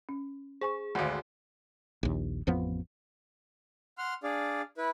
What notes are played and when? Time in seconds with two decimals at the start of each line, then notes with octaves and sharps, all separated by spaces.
0.09 C#4
0.61 G#4 C5 G#5 C#6
0.95 G#1 D2 F5 F#5
2.03 A#1 D#2
2.47 A1 F2 F3 B3
3.98 F#5 C6 F6
4.23 D4 G#4 D5 F5
4.78 E4 B4